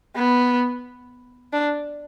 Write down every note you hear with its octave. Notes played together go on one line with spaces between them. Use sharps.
B3
D4